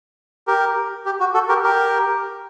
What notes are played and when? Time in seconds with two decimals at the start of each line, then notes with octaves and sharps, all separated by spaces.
0.47 G4 A#4
1.06 G4
1.20 F#4
1.34 F#4 A4
1.49 G4 A#4
1.63 G4 A#4